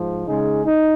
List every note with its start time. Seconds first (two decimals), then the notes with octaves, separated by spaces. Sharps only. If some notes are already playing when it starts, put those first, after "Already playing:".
Already playing: G#2 F3
0.27 C#3 G#3 D#4 G#4
0.66 D#4